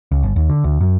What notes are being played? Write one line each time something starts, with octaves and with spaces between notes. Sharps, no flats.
C#2
G1
D#2
D3
D2
F#2